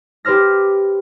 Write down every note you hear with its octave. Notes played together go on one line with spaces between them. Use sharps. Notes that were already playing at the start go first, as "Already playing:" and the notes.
G4 B4 C5 F6 A#6